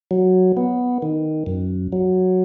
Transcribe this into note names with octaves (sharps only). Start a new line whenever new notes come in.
F#3
B3
D#3
F#2
F#3